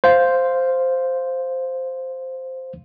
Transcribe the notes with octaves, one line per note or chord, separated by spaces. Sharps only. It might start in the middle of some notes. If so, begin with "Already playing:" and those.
C5 F5